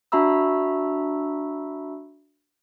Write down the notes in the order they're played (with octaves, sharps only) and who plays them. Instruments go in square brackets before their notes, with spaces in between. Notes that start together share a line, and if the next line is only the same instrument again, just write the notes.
[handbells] D4 F#4 E5 A#5 B5 E6